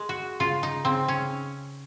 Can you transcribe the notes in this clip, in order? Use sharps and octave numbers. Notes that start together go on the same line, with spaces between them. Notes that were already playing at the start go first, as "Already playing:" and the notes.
Already playing: G#3
F#4
C#3 F4
D#4
C#3 C4
C#4